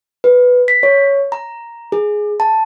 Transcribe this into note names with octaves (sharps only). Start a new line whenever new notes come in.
B4
B6
C#5
A#5
G#4
A5